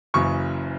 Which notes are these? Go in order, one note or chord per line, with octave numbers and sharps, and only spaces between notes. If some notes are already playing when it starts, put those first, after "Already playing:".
F#1 F#2 C#3 E3 C#6